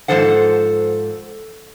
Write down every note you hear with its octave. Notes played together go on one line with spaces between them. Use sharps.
G#2 E3 F3 A4 C5 F#5